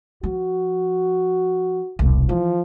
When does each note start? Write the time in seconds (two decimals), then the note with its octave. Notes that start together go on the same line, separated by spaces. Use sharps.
0.23 F3 F#4
1.99 E1 C2
2.29 E3 F3